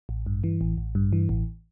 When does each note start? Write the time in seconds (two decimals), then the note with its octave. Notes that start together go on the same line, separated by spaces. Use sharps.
0.09 A1
0.26 G2
0.44 E3
0.61 A1
0.78 A1
0.95 G2
1.13 E3
1.29 A1